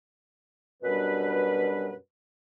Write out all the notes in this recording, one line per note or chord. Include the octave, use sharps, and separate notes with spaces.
F#2 B2 G3 D4 G4 B4